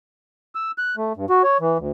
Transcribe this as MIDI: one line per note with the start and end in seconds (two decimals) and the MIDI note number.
0.55 0.71 88
0.78 0.95 90
0.97 1.13 57
1.17 1.26 43
1.30 1.42 66
1.43 1.57 73
1.60 1.78 52
1.79 1.92 38